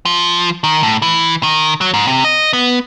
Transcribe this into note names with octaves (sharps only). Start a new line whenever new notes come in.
F3
D#3
A2
E3
D#3
F#3
G#2
C3
D#5
B3